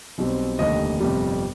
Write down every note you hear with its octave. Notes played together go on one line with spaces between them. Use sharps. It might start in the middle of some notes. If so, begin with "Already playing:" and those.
B1 B2 G3 C4
F1 D#2 D3 G3 D#5
G1 F2 C3 G3